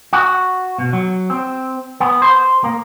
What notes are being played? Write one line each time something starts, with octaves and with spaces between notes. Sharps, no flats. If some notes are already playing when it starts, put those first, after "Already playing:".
F#4
B2
F#3
C4
B3
C5
A#3